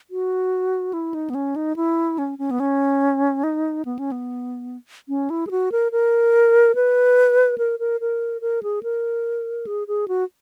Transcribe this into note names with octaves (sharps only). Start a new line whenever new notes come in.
F#4
E4
D#4
B3
C#4
D#4
E4
C#4
C#4
B3
C#4
D#4
B3
C#4
B3
C#4
E4
G#4
F#4
A#4
A#4
B4
A#4
A#4
A#4
A#4
G#4
A#4
G#4
G#4
F#4